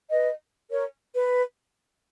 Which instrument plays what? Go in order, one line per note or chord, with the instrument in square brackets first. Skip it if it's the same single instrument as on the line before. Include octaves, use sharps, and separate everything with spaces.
[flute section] B4 D#5
A#4 C#5
B4